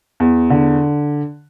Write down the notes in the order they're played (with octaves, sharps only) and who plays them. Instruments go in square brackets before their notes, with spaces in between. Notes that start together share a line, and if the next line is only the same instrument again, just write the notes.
[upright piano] E2
D3